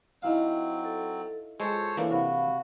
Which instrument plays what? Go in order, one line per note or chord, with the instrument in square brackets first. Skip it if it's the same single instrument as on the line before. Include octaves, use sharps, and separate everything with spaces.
[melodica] F#3 C4 [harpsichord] D#4 E4 F5
[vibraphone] A4
[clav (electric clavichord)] G#3 [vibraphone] F4 G#4 [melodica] A4 C5 C#5
[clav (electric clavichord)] E3 A#3 D4 [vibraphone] E4 A4 C#5
[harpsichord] C3 [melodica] F#4 [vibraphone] F5 B5